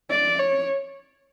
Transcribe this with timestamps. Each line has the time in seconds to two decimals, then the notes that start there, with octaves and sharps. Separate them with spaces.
0.10 D5
0.39 C#5